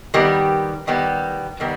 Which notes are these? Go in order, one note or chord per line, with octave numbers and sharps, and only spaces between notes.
D#3 G3 B3 G4 A#4
D#3 G3 B3 G4 A#4
D#3 G3 B3 A#4